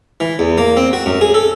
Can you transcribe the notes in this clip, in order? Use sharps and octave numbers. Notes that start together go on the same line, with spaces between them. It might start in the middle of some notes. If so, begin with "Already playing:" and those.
E3
E2
A#3
C4
F#4
F#2
G#4
A4